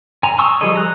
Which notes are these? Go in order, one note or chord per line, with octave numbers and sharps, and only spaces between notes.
G#5 A#5
A5 C6 C#6 D#6 E6
F3 G3 G#4 A4 D#5
A#5 F#6